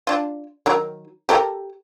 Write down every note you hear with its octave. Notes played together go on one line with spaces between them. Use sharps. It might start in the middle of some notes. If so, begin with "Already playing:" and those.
D4 F4
D#3 F#3 A#4
G4 A4 A#4